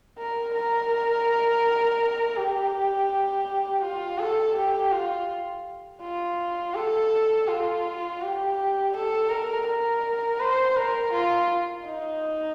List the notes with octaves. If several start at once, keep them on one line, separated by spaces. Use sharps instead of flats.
A#4
A#4
G4
F4
A4
G4
F4
F4
A4
F4
G4
A4
A#4
A#4
C5
A#4
F4
D#4